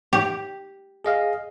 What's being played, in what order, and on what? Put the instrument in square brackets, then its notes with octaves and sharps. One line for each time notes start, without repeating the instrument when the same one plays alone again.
[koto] G4
[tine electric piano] G#4 D#5 F5